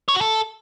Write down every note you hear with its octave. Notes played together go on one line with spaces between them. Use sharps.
C#5
F#4
A4